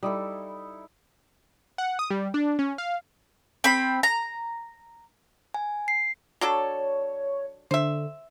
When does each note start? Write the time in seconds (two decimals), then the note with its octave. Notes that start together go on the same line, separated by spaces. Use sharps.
0.03 G3 D#4 E4 A4
1.78 F#5
1.99 D#6
2.11 G3
2.34 D4
2.59 C#4
2.78 F5
3.64 C4 B5
4.03 A#5
5.54 G#5
5.88 C7
6.41 F#3 D4 A4 C#5
7.71 D3 C5 E5